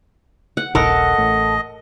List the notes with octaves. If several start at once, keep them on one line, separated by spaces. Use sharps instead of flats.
F#5
D#1 A#1 A4 A#4 D#5 F#5
A1 A2